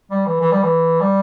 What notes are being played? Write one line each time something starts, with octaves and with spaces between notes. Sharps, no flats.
G3
E3
E3
G3
E3
G3